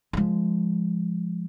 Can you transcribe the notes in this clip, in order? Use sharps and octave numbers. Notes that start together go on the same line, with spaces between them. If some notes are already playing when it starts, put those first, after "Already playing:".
F3 G#3